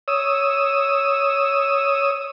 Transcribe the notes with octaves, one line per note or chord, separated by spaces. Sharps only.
C#5 D#6 E6